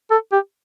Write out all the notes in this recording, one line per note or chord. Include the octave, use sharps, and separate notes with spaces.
A4
G4